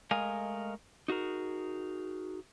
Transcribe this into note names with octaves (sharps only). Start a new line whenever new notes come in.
G#3 A3 A#4 D#5 F5 G#5
D#4 F#4 G#4 A#4